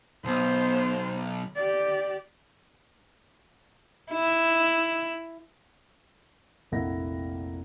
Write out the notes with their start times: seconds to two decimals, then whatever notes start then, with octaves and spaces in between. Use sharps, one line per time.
0.25 B1 B3 C5
1.56 G4 D5
4.11 E4
6.72 F1 A#1 A#3 E4 F#5 A#6